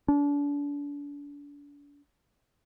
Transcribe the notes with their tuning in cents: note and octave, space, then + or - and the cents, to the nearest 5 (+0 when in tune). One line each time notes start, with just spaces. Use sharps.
D4 -35